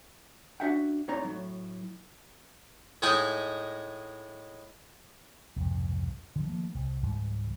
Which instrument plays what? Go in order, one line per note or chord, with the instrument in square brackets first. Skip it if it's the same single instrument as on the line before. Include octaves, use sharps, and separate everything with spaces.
[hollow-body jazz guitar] C#4 D4 F#4 E5 F#5 G5
A2 C4 D#4 C#5 D5 A#5
A2 F#3
[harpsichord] A2 G#3 D#4 G#4 G5 A5
[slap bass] C2 F2 G#2 B2
D3 F3
D#3 F3 A3 A#3
C2
C#2 G#2 E3 G3